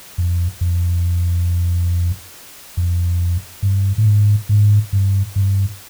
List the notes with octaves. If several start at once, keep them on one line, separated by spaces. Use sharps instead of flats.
F2
F2
F2
G2
A2
G#2
G#2
G2
G2